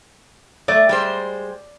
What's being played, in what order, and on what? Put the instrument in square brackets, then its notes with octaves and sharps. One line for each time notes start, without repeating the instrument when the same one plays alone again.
[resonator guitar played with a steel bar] A3 [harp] D5
[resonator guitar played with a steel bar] G3 G#3 C5